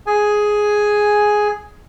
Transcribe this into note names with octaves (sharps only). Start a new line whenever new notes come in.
G#4 G#5